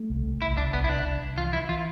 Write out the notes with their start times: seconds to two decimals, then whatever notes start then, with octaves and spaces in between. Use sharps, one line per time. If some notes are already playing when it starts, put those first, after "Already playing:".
Already playing: A3
0.10 C2
0.25 C2
0.42 C2 E4
0.57 C2 D4
0.73 C2 B3
0.84 E4
0.89 C2 D4
1.05 C2
1.21 C2
1.37 E3 F4
1.53 E3 E4
1.69 E3 F4